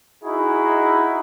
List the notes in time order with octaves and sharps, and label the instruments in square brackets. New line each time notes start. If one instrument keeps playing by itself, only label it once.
[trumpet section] D#4 E4 F#4 G#4